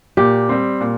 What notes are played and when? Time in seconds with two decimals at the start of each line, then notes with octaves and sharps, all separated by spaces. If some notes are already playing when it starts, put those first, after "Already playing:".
0.17 A#2 G4
0.49 G3 C4
0.81 A#2